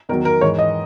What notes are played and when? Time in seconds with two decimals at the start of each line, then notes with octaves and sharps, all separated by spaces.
0.09 E2 D#3 F#3 A#4
0.25 A#4
0.41 G#2 E3 C#5
0.59 D#5